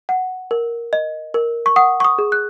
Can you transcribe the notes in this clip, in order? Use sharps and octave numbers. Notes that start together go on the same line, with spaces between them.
F#5
A#4
D#5
A#4
C#6
F#5 D#6
C#6
D#6
G#4
F#6